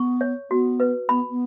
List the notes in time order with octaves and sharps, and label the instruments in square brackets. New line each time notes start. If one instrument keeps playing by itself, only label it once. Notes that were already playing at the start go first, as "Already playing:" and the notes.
Already playing: [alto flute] B3 [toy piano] C#6
[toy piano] C#5
[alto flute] B3 [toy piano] F#4
[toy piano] B4
[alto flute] B3 [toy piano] B5
[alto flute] B3